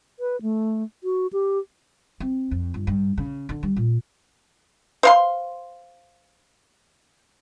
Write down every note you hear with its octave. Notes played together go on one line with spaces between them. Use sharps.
B4
A3
F#4
G4
C4
F2
G1
G2
C#3
D3
G3
A#2
C5 F5 C6